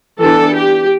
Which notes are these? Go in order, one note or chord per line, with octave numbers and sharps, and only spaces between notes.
E3 B3 D4 A4
G4